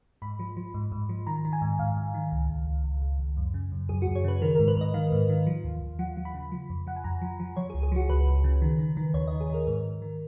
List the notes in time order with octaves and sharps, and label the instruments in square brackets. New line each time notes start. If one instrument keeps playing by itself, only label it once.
[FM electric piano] G#2 B5
F3
F3
G#2
G#2
F3
D#3 A#5
D#3
G#5
G#2
G#2 F5
G#2
D#3
C#2
C#2
C#2
C#2
C#2
C#2
F#2
C#3
F#2
F#2 G#4
F#4
F#2
C#5
C#3 B4
D#3 A#4
G#2 A#4
B4
G#2 D#5
D#3 F5
G#2
D#3
F3
D#2
D#2
F3 F#5
F3
B5
C#3
F3
F2
F3 F#5
G#5
F2 A#5
F3
F3
F3 C#5
G#4
C#2
G#4
F3 F#4
C#2 B4
C#2
C#3
D#3
D#3
D#3
D#2 C#5
D#3 D#5
G#4
D#3 A#4
G#2
G#2
D#3